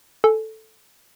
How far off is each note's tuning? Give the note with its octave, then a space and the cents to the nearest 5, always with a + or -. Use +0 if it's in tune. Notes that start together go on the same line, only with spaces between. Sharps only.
A4 +0 G#5 +20